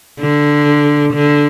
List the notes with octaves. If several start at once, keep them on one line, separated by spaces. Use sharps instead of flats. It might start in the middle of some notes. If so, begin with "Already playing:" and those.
D3
D3